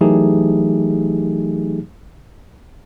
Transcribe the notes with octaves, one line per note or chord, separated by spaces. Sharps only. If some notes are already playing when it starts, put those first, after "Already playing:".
E3 F#3 A3 D#4 G4 G#4